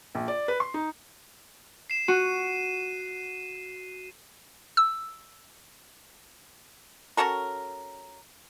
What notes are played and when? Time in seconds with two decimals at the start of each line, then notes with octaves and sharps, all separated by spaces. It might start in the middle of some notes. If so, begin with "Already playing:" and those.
0.15 A#1
0.28 D5
0.48 B4
0.60 C6
0.74 D#4
1.90 C7 E7
2.08 F#4 D#7
4.77 E6
7.17 C#4 F#4 A4 A#4